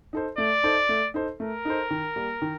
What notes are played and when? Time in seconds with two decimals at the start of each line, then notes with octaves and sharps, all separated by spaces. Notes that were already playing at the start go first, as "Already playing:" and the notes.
0.13 D#4 A4 C5
0.38 A3 D5
0.64 D#4 A4 C5
0.89 A3
1.14 D#4 A4 C5
1.40 A3 A#4
1.65 D#4 A4 C5
1.90 D#3
2.16 G3 A#3
2.42 D#3